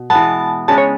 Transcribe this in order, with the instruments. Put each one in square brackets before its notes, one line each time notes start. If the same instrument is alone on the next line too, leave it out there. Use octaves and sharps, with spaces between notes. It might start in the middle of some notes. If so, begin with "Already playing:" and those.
Already playing: [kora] B2
[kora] E3 G#3 B3 [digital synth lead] A5
[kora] C#3 G#3 D4 [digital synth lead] A5
[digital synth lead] C#5